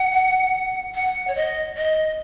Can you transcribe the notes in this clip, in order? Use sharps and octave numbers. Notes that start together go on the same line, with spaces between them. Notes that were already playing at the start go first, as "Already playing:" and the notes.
Already playing: F#5
F#5
C#5
D#5
D#5